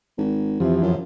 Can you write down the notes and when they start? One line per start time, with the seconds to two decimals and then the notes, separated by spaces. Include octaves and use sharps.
0.18 G#1
0.60 F2 C3 E3 F3
0.82 F#2